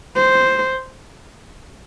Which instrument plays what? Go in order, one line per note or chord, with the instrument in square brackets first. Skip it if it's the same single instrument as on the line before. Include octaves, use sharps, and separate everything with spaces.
[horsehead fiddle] C5